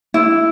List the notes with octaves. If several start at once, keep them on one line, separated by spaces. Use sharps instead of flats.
E4